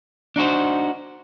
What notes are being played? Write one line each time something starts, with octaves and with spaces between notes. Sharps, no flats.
D4 D#4 F#4 C5